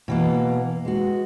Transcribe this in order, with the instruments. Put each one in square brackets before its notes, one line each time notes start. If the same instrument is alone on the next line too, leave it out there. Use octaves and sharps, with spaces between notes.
[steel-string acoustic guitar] B2 E3 A#3
G#3 F#4